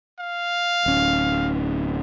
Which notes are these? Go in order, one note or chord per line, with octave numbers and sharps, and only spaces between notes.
F5
D1 C#4